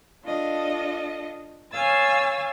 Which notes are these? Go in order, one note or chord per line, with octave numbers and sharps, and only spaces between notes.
D4 F4 A4 D#5
C#5 F5 G#5 E6 A6